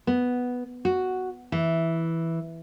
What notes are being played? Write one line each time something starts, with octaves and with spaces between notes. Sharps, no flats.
B3
F#4
E3